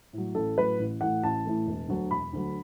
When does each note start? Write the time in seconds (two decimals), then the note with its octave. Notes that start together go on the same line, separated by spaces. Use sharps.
0.13 A2 F#3
0.35 A1 A4
0.57 A2 F#3 B4
0.79 A1
1.01 A2 E3 A3 F#5
1.23 A1 A5
1.45 A2 E3 A3
1.67 E1
1.89 D2 D3 F#3
2.11 E1 B5
2.33 D2 D3 F#3